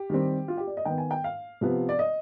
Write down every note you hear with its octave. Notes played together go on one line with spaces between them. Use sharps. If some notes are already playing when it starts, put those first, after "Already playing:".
Already playing: G4
D#3 G3 C4
F4
G4
D5
D#5
D#3 B3 G5
G#5
G5
F5
C3 F3 B3
D5
D#5